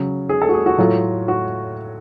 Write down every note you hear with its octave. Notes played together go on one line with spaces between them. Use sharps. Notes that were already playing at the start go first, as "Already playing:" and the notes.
Already playing: C#3 F#3
G#4
A4
F#4
G#4
F#4
A2 F#3 F4
F#4